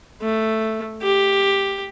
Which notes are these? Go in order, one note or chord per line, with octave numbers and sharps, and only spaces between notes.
A3
G4